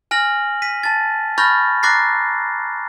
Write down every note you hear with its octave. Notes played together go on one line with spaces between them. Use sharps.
G#5 F6 A#6 F#7
B6 D#7
A5 A6
B5 C#6 F6 G6 A6 A#6
A#5 D6 F#6 A6 A#6 C7